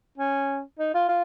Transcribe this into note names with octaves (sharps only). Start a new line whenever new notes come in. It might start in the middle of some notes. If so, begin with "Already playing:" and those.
C#4
D#4
F4
F4